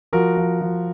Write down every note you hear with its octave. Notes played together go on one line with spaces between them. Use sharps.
F3 F#4 A#4
F3
F3